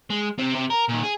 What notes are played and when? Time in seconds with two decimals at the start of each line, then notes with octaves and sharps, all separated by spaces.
0.10 G#3
0.39 C3 C4
0.55 C3
0.70 A#4
0.88 A#2 D#3
1.03 G#4